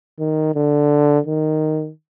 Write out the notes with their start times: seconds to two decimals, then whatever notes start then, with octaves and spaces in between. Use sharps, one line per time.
0.19 D#3
0.55 D3
1.26 D#3